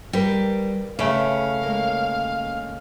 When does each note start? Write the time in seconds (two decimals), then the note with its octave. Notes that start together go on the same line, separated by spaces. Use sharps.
0.13 G3 A#4 B4 G5
0.99 C#3 A3 C#4 B4 F5
1.63 G#3 A#3